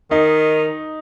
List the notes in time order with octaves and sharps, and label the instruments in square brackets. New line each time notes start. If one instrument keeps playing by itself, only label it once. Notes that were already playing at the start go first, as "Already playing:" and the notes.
[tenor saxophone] D#3 [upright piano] D#4